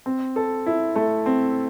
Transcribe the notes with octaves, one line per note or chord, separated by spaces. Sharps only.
C4
A4
E4
A3
C4